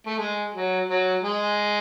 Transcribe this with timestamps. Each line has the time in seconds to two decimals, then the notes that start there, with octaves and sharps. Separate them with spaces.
0.06 A3
0.18 G#3
0.54 F#3
0.88 F#3
1.24 G#3